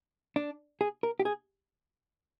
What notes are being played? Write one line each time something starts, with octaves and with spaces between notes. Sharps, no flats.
D4
G#4
A#4
G4
G#4